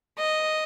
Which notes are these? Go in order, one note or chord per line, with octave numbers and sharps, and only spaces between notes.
D#5